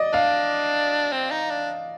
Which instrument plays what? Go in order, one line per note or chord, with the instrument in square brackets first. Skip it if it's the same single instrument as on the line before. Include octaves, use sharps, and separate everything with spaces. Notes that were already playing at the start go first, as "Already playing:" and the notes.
Already playing: [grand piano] D5 D#5
[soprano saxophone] D4 [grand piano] F5
[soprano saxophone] C4
D#4
D4